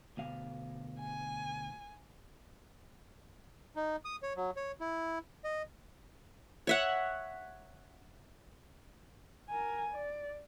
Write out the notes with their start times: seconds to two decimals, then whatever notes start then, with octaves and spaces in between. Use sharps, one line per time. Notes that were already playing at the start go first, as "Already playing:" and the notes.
0.17 D2 B2 F5
0.99 G#5
3.76 D#4
4.05 D#6
4.23 C#5
4.36 F#3
4.57 C#5
4.80 E4
5.44 D#5
6.67 C#5 E5 F#5
9.49 A#4 G#5
9.94 D5